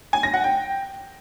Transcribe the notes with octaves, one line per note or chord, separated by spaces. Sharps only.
G#5
A#6
F#5
G5